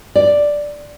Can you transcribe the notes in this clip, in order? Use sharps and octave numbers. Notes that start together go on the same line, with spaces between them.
D5